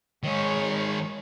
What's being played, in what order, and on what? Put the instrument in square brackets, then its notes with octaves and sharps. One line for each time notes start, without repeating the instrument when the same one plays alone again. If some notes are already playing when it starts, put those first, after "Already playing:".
[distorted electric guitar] D#3 G#4 [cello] G#3 C#5